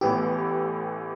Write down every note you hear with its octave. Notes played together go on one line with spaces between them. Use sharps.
A1 A2 E3 B3 E4 G4